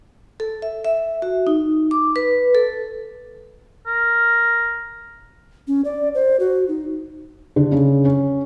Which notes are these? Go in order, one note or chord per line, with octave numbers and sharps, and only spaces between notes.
A4
E5
E5
F#4
D#4
D6
B4
A4
A#4
C#4
D5
C5
F#4
D#4
D3
C#3
C#4